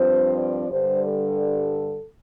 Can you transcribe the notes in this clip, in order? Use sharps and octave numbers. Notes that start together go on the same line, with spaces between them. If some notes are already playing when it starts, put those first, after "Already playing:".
Already playing: G2 F3 C4 C5
D5
G2 D3 G3 C5
A4